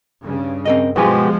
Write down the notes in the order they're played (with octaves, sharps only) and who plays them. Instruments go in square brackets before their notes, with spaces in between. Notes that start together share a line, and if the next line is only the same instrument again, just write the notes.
[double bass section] G2 C#3
[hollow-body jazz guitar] C4 A#4 D#5
[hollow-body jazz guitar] B2 G#5 [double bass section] F3 G#3 [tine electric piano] B3 F#4 G4